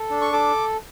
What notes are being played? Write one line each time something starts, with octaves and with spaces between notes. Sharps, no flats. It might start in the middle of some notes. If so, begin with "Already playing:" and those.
Already playing: A4
D4
C#6
A4 D6